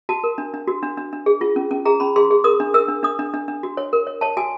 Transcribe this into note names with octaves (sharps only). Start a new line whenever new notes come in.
F#4 A5
A#4
D4
D4
F#4
D4
D4
D4
G#4
F4
C#4
C#4
G#4 A#5
C#4 B5
G#4 C6
G#4
A#4 D#6
D4
A#4 E6
D4
D4 D#6
D4
D4
D4
F#4
C#5
A#4
C#5
C#5 A5
F#4 G#5